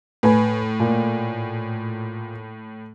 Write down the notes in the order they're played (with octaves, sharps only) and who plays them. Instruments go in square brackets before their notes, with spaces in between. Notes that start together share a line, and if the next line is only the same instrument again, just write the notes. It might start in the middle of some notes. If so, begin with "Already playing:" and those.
[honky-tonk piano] A2 [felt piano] B4 G#5 B5
[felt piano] A#2